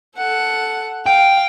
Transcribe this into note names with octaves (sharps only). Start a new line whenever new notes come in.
A4 F#5
F5 G5